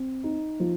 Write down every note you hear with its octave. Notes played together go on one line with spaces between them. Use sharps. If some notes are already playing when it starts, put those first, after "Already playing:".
Already playing: C4
D#4
F3